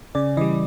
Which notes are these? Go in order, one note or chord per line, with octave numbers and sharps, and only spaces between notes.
C#3 D5
E3 G3 D#5